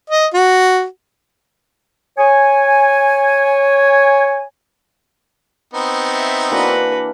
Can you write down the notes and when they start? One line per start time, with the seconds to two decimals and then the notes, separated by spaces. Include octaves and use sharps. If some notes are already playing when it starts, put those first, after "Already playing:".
0.10 D#5
0.34 F#4
2.18 C#5 G#5
5.74 B3 C4 D#4
6.14 E5
6.51 E3 A#3 D4 F#4 B4